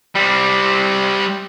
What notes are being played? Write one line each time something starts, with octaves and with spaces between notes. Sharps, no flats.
G3 C4